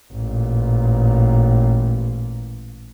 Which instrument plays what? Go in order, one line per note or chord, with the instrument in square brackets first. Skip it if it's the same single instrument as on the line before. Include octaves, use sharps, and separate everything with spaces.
[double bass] A1 A#2